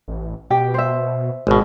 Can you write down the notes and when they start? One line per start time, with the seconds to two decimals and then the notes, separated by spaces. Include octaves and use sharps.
0.08 A1
0.50 B2 G4 G5
0.74 C5 E5
1.47 G#1 B2 G#3